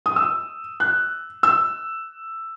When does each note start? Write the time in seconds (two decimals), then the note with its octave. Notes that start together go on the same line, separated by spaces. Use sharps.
0.06 D#6
0.16 E6
0.80 F#6
1.43 E6